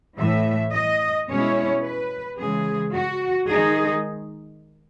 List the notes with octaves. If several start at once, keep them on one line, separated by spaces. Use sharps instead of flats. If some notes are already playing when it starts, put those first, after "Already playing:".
A2 E3 A3 E5
D#5
B2 G#3 C#4 E4 C#5
B4
C#3 E3 G#3 G#4
F#4
D#3 G#3 D#4 G#4